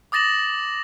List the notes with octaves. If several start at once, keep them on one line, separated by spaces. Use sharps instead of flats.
D6 D#6 A6 A#6 E7 F#7